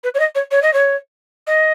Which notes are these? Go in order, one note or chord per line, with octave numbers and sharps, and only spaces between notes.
B4
C#5
D#5
C#5
C#5
D#5
C#5
D#5